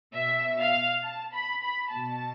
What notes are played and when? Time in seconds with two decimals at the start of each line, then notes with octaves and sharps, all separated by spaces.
0.15 B2 E5
0.59 F5
1.03 A5
1.34 B5
1.63 B5
1.92 B2 A5